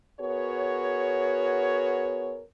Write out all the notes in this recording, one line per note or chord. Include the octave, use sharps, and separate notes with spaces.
B3 F#4 G#4 A#4 C#5